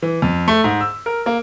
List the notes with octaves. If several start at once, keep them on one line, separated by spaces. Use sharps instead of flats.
E3
F2
A3
G#2
E6
A#4
A#3